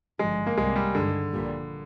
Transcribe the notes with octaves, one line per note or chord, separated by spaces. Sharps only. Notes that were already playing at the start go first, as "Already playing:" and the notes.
G#1 G2 D3 F3 G#3
A#3
C2 C3 G3 G#3
G3
G2 D3 D#3 G#3
A#1 A#2 G3